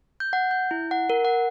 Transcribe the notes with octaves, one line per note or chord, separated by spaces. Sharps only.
G6
F#5
G6
E4
F#5
A#4
F#5